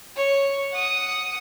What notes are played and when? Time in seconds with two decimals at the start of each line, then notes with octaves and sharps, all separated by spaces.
0.16 C#5
0.72 F#5 D#6